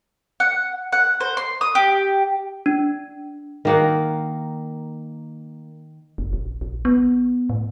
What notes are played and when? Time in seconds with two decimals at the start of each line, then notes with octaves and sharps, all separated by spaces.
0.40 F#5
0.92 F#5
1.20 C5
1.37 C6
1.61 D#6
1.75 G4
2.66 D4
3.65 D#3 A#3 F#5
6.18 F#1
6.33 A#1
6.61 A#1
6.85 B3
7.50 A2